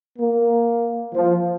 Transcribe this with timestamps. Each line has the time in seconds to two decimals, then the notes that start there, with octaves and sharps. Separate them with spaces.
0.18 A#3
1.13 F3